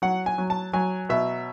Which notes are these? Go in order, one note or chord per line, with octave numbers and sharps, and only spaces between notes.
F#3 F#5
G#5
F#3
A5
F#3 G#5
B2 E5